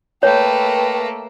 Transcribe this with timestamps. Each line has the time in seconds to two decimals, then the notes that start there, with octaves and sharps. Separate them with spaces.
0.23 A3 A#3 B4 C#5 G5